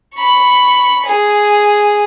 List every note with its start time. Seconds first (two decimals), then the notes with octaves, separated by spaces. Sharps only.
0.15 B5 C#6
1.06 G#4